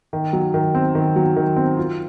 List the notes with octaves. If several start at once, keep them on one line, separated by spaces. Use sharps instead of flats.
D#3
F#3
D#3
C4
D#3
F#3
D#3
C4
F4